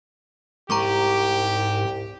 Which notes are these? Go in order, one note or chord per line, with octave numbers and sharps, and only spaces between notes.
C2 G#2 G4 A#5 C#6 D6